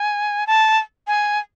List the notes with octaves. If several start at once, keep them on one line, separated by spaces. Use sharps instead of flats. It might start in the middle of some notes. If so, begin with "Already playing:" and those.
Already playing: G#5
A5
G#5